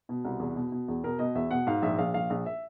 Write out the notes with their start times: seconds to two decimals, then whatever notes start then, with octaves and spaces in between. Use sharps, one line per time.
0.09 B2
0.25 C2
0.40 E2
0.56 B2
0.72 B2
0.88 E2
1.03 B2 A#4
1.19 B2 D#5
1.35 E2 E5
1.51 B2 F#5
1.67 G#2 F5
1.82 A#1 E5
1.98 A#1 F5
2.14 A#1 F5
2.30 A#1
2.46 E5